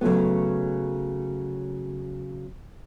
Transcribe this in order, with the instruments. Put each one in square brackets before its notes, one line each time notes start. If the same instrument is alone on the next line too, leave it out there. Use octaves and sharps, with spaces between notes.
[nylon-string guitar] C#3 F#3 A3 B3